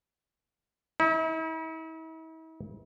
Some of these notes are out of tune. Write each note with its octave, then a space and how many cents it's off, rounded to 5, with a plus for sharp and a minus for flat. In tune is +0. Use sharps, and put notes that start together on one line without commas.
E4 -45